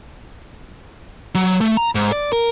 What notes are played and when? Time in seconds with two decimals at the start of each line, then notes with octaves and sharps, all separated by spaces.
1.35 F#3
1.61 A3
1.77 A#5
1.95 G#2
2.12 D5
2.33 A#4